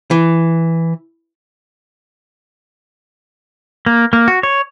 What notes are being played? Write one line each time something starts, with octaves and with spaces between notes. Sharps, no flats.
E3
A#3
A#3
F#4
C#5